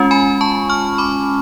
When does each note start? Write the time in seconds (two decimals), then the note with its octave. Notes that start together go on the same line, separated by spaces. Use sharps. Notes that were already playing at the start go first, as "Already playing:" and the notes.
Already playing: G#3 C#4 F4
0.11 G#5 B5
0.41 A5 C#6
0.70 C#6 F6
0.98 B5 D6